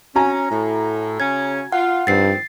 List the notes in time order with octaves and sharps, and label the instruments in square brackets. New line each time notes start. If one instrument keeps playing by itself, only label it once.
[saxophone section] C#4 [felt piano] F#4 G#5 A#5
[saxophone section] A2
[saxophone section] C#3 C#4 [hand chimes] G#6
[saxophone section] F4 [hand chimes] F#5
[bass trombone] G2 [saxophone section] D#3 F3 C4 [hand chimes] A6 C7